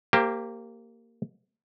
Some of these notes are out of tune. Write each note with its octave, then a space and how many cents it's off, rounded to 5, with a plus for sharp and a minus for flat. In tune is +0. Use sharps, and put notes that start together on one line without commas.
A#3 -15 G4 +0 C5 +20